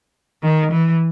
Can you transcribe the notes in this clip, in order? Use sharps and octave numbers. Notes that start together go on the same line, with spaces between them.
D#3
E3